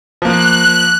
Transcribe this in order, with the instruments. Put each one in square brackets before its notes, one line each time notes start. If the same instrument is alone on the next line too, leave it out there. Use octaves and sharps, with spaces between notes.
[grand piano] F3 A#3 [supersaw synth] F#6